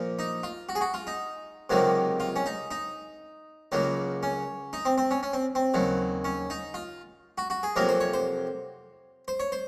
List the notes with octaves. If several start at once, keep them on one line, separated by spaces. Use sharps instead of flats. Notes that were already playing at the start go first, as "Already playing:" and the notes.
Already playing: A#2 F3 A#3
D#4
F4
F#4
G#4
F#4
F4
D#4
C#2 C3 D#3 F#3 A#3
F4
C#4
D#4
D#4
C#2 C#3 F#3 A#3
C#4
D#4
C4
C4
C#4
C#4
C4
C4
D#2 C#3 F#3
C#4
D#4
F4
F#4
F#4
G#4
F2 C3 F#3 A#3 A#4
C5
C#5
C5
C5
C#5
C5